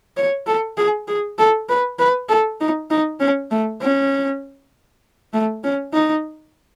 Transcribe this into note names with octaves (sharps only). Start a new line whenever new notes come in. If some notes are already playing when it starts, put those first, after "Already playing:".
C#5
A4
G#4
G#4
A4
B4
B4
A4
D#4
D#4
C#4
A3
C#4
A3
C#4
D#4